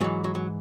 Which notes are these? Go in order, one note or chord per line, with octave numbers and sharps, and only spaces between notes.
G#2 E3 F#3
F#3
F#3